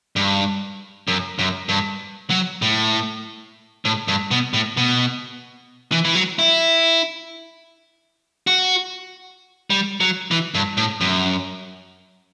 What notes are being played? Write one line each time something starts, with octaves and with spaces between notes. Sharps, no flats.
G2
F#2
F#2
G2
F#3
A2
A2
G2
B2
A2
B2
E3
E3
F#3
E4
F#4
G3
F#3
E3
G2
A2
F#2